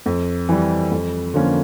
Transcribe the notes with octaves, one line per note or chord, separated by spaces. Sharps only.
F2
E3 G3
F2
D3 F3 A#3 C#4